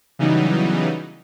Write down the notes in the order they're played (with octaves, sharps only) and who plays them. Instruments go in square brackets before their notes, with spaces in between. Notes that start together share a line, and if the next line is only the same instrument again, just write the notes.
[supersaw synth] C#3 E3 F#3 G3 B3 D#4